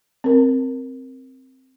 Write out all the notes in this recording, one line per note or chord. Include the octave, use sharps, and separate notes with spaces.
C4 A#4